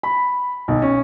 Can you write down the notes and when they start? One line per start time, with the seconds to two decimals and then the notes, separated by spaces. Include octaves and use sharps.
0.03 B5
0.68 B1
0.82 C#4